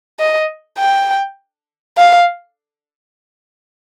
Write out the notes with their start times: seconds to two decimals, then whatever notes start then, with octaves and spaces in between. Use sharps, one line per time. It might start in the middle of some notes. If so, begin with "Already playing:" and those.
0.20 D#5
0.79 G5
1.98 F5